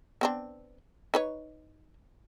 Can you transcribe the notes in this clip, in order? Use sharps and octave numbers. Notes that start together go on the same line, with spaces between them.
B3 C4 D4
D#4 B4 C#5